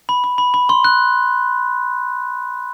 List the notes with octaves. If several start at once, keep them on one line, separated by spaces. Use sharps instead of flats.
B5
B5
B5
B5
C6
F#6